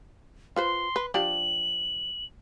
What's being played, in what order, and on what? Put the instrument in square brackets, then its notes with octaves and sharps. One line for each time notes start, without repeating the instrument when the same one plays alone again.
[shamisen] F4 B4 C5 [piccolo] C6
[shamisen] B4
[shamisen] F3 D4 G4 [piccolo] F#7